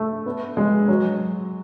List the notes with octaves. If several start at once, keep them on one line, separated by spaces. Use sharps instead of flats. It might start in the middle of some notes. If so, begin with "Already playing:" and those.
Already playing: A3
B3
G#3
F#3